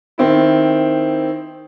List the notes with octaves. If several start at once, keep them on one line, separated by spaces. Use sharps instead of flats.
D#3 C4 E4